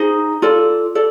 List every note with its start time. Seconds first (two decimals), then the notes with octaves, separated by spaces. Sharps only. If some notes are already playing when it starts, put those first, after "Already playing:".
Already playing: D#4 G#4 C5 D#5
0.42 F4 A4 D5
0.95 A4 D5